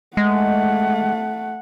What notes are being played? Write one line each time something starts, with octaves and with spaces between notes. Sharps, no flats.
G#3 A3 F#5